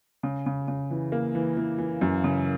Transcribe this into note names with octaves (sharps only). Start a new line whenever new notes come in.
C#3
C#3
C#3
E3
A#3
E3
E3
E3
F#2
C#3